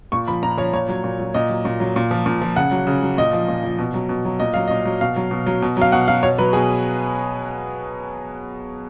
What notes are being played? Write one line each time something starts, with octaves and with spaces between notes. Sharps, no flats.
A#2 C#6
F3 B5
A#2 A#5
F3 C#5
A#2 C#5
F#3
A#2
F#3
A#2 D#5
F#3
A#2
F#3
A#2
F3
A#2
F3
C#3 F#5
F#3
C#3
F#3
A#2 D#5
F3
A#2
F3
B2
F#3
B2
F#3
A#2 D#5
F#3 F5
A#2 D#5
F#3
B2 F5
F#3
B2
F#3
B2
F#3 F5
B2 F#5
F#3 F5
B2 C#5
F#3 B4
B2 G#4